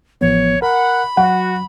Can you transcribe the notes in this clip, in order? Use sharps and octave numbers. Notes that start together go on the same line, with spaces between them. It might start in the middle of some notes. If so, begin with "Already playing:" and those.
A1 F3 B3 C#5
A#4 F#5 B5
F#3 F#4 F#5